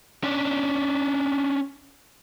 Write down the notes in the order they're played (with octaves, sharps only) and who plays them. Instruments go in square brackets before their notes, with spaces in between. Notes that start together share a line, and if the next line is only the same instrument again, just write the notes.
[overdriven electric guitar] C#4 D4